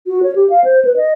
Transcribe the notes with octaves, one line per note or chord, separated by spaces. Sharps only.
F#4
C#5
G4
F5
C5
B4
D#5